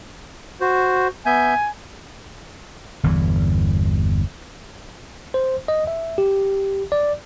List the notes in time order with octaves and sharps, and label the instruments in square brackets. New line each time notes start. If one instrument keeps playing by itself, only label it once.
[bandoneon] F#4 C5
[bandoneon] B3 E5 G6 [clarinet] G#5
[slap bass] G1 E2 E3
[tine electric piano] C5
D#5
E5
G4
D5